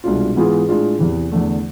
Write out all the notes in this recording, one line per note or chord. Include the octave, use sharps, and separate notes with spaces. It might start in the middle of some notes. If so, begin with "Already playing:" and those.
C2 B2 G#3 D4 F4
G#2 E3 B3 F4 G#4
A2 G#3 D4 F4 G#4
E2 C3 E3
E2 D3 A3